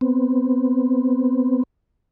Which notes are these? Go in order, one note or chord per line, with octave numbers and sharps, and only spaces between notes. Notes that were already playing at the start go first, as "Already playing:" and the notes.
B3 C4